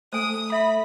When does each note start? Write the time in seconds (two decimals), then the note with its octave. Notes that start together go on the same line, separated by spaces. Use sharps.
0.13 A3 C5 G#5 D#6
0.52 E5 B5